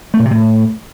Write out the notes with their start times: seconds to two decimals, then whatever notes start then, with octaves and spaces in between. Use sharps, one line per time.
0.14 A3
0.20 A#2
0.25 C3
0.31 A2